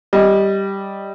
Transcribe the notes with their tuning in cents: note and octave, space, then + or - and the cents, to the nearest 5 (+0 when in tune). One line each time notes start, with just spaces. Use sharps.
G3 +0 D#5 +5